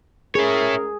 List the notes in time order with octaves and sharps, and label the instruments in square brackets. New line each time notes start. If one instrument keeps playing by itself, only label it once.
[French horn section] A2 C#4 A#4 [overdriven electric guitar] E4 C#5 [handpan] G#4